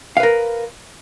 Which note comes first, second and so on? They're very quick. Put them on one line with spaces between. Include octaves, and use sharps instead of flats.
F5 B4 A#4